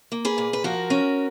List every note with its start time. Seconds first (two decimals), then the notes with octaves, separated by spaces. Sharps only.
0.12 A#3
0.25 G#4 B4
0.38 A#2
0.53 B4
0.64 F3 F#4 A#4
0.90 C#4